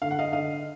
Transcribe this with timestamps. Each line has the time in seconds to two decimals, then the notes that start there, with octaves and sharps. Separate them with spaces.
0.02 D3 F5
0.11 F#5
0.19 D#5 F5
0.32 D3 D#5 F5